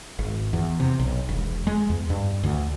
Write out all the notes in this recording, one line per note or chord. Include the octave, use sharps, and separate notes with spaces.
G#1
E2
C3
B1
E1
G#3
E2
G2
D2